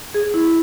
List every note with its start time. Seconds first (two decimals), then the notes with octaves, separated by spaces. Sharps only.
0.14 G#4
0.34 E4